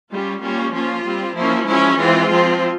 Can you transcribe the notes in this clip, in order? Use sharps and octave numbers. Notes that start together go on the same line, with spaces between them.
G3 C#4 F4
G3 A#3 C#4 F4
F3 A#3 C#4 F4
G3 C4
F3 A#3 C#4 E4
F3 G#3 C#4 E4
E3 G#3 C4 F4
F3 C4